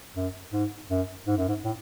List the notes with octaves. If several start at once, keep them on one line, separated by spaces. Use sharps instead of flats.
F#2
G#2
F#2
G#2
F#2
G#2
A2